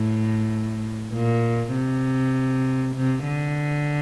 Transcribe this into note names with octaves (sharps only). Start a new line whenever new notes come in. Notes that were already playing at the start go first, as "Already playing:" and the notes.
Already playing: A2
A#2
C3
C3
D3